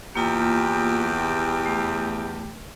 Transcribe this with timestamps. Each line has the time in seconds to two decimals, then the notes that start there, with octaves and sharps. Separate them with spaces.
0.15 E2 A#3 F4 G4
1.66 A3